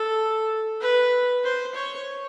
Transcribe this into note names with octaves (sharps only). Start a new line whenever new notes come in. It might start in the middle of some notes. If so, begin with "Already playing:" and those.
Already playing: A4
B4
C5
C#5